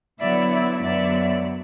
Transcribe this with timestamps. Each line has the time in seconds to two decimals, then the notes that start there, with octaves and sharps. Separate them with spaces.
0.19 D3 F#3 B3 E4 D5 E5
0.51 D5 E5
0.82 F#2 D3 F#3 B3 D5 E5